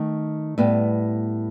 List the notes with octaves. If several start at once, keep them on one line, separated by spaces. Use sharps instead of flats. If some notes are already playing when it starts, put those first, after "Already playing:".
Already playing: D#3 A3
A2 G3 B3